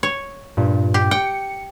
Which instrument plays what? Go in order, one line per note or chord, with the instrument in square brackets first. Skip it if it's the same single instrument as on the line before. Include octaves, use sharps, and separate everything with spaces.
[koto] C#5
[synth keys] G2 A#2
[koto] G4
[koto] G5 [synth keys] C#7